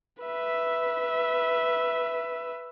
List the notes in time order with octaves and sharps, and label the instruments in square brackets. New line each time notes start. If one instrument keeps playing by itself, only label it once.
[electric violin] B4 E5